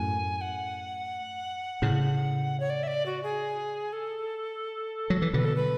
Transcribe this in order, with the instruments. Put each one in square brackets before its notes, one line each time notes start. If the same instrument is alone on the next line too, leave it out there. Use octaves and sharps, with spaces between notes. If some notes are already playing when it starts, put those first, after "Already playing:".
Already playing: [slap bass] F#2 A2 [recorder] G#5
[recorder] F#5
[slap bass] A2 C#3
[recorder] C#5
D5
E5
D5
F#4
G#4
A4
[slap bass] F#3
E3
[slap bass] B2 D3 [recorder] B4
[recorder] A4
B4